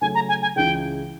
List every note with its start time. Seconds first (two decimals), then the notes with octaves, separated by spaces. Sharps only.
0.01 C#3 F#3 A3 C#4 G#5
0.15 A#5
0.29 G#5
0.42 G#5
0.56 C#2 C#3 E3 G#3 G5